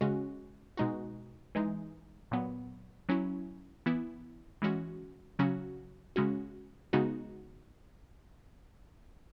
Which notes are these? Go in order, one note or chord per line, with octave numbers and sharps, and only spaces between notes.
C#3 G#3 C#4 F#4
B2 G#3 D#4 F#4
E3 G#3 D#4
A#2 F#3 B3
F#3 C#4 E4
E3 B3 E4
E3 G#3 C#4 F#4
C#3 F#3 C#4 F#4
C#3 G#3 C#4 F#4
C#3 G#3 B3 D#4 F#4